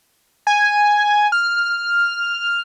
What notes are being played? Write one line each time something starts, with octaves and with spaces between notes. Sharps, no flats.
G#5
F6